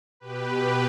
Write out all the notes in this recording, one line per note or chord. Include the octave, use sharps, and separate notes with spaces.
B2 G4 B4